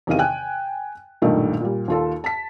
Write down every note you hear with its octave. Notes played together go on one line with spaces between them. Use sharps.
E2 C3 D#3 F5 D#7
G5 G#5 F#6
B1 G2 A#2 D#3 A3
A#2 G3
D#2 F4 A4
A5 B6